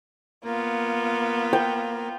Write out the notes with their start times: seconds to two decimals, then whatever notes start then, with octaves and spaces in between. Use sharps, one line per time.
0.44 A#3 B3 F4
1.53 G5